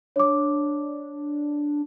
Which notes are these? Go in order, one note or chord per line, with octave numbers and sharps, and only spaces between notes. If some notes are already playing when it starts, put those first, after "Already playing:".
D4 C#5 D6